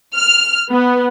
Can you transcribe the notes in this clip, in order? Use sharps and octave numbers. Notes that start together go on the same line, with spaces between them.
F6
B3